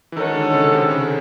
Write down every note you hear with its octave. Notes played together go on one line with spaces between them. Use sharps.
E3
D#3 G#3 C#4 F#4 A4
D3
C#3
C3
C#3